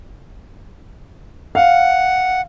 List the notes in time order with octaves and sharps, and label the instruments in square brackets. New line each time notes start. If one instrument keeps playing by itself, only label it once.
[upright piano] F5 [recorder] F#5